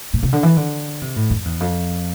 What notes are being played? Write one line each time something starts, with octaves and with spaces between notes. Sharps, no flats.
A#2
C3
D3
E3
D3
C3
A2
F2
E2
F2